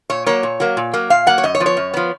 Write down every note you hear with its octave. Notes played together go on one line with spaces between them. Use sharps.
A#2 C#5
F#3 A#3 C#5
A#2
F#3 A#3
A#2
F#3 A#3
A#2 F5
F#3 A#3 F#5
C#5
F#2 D#5
C#5
F3 B3
C#5
F#2
F3 B3